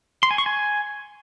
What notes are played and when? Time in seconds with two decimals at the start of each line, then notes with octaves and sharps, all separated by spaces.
0.23 C6
0.31 G#5
0.38 C#6
0.46 G#5